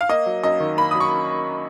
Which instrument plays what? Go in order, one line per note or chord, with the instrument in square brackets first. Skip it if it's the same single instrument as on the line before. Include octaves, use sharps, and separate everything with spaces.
[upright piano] F5
A#3 D#5
F#3
F#2 D#5
D#3
A#3 B5
F#3 D#6
C#6